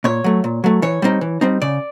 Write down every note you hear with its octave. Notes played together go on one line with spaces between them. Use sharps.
A#2 C#5
F#3 A3
A#2
F#3 A3
E3 C#5
G3 C4 D#4
E3
G3 C4 D#4
C#3 D5